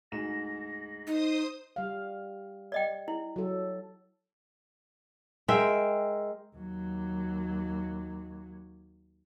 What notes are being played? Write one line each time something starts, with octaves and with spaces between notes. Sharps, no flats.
D2 G#2 A#6 E7
D#4 C5 D#6
G3 F5
D5 D#5 G5
E4
F#3 A4
G#3 A#4 E5 G5
D#2 F#3